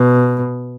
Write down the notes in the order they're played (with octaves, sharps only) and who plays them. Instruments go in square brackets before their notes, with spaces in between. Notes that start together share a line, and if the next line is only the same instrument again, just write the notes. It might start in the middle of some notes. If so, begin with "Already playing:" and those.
Already playing: [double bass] B2